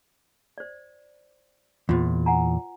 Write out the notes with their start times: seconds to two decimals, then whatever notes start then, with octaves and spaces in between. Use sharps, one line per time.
0.58 C5 D5
1.89 E2 A#2 F4 C5
2.26 F#5 G#5 A#5